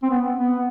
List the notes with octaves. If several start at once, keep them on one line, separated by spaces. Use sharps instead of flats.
C4
B3
B3